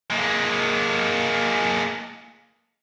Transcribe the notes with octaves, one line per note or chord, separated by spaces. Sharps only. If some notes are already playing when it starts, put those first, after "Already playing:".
G#3 A#3